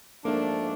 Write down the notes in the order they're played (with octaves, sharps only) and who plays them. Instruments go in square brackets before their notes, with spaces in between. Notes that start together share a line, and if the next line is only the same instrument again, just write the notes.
[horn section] G#2 F3 A3 D4 [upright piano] A#3